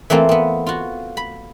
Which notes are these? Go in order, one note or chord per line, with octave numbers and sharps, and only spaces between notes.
E3 A3 A#3 C4 F4
B3 C4
F4 F#4
B5